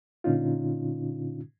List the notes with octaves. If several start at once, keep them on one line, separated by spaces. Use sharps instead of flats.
A#2 D3 C#4 D#4 F4